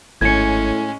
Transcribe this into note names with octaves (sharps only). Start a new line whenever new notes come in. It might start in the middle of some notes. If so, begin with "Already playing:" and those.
G#1 A2 G#3 C#4 G#6 C#7